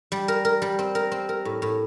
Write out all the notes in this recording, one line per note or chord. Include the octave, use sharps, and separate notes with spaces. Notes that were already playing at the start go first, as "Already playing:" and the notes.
G3
A#4
A#4
G3
C4
A#4
C4
A#4
A2
A2